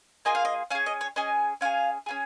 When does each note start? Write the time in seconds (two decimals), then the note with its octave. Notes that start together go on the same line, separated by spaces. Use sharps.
0.25 A#3 F4 G#4 D#5
0.35 F5
0.45 D#5
0.71 C#4 F5
0.75 G#4
0.86 D#5
1.01 C#5
1.16 C#4 G#4 D#5
1.61 C#4 F4 G#4 F5
2.06 C#4 F4 G#4